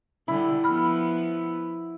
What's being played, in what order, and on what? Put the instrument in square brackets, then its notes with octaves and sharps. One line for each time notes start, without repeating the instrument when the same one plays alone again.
[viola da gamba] D3 G3 [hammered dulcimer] E4
[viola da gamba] F3 B3 [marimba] B5 F6